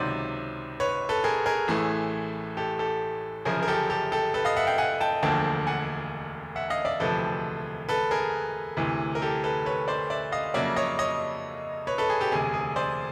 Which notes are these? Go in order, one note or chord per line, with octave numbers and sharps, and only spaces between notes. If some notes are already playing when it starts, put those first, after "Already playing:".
Already playing: C#2 C3 D#3 F#3 C5 D5
B4 C#5
A4 B4
G#4 A#4
G#4 A#4
A1 A2 E3 A3 G#4
G4 A4
G4 A4
G1 F#2 C#3 F3 G#4 A#4
A#4
G4 A4
G4 A4
G4 A4
A4 B4
D#5 F5
E5 F#5
F5 G5
F#5 G#5
G5 A5
E1 D2 D3 F3 A#3 G5 A5
F#5 G#5
E5 F#5
D#5 F5
D5 E5
E1 D2 C3 F3 A4 B4
A4 B4
G#4 A#4
D2 C3 E3
A#4
G4 A4
A4 B4
B4 C#5
C5 D5
D5 E5
D#5 F5
F2 C#3 F#3 A#3 D5 E5
C#5 D#5
C#5 D#5
B4 C#5
A4 B4
G#4
G4 A4
E1 D2 C3 G#4
G#4
C5 D5